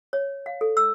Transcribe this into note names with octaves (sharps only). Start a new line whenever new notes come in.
C#5
F5
A4
E6